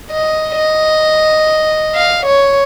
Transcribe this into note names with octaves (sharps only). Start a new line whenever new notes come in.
D#5
D#5
F5
C#5